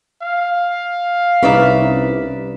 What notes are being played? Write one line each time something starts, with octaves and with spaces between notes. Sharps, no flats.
F5
C2 C#4 D#4 B4 D5 E5